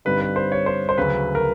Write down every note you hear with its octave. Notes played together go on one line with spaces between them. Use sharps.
G2 D3 G3 C4 D#4 B4
B4
C5
C#5
C5
C5
D2 C#3 F#3 B4
A#4